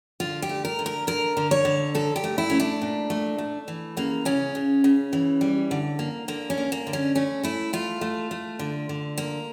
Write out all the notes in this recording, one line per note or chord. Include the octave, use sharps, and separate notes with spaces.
D3 F4
G4
A3
A#4
D3
A#4
D3 A#4
D3
C#5
D3
A#2 A4
G4
A3
E4
A3 C#4
D4
A#2
A3
A3
E3
C#3 A#3
C#3 C#4
C#3
C#3
E3
G3
D3
A#3
D3 A#3
C#4
A#3
A#3
D3
C#4
A3 C#4
A3 E4
A3 F4
A3
A3
D3
D3
A#3